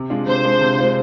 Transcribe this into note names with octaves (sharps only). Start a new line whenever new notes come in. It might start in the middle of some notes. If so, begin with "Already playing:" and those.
Already playing: C3
G#3 D4 F4
C3 C5
G#3 D4 F4
C3
G#3 D4 F4